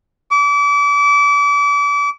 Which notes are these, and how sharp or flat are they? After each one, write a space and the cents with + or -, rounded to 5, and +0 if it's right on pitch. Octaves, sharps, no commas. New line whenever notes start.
D6 -35